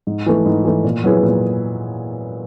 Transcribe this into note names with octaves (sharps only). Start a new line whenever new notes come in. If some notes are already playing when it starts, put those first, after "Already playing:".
G#2
E3 A3
G#2
E3 A3
A#2
F#3 B3 E4 G#4
A#2